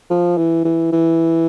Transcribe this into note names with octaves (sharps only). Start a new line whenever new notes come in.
F3
E3
E3
E3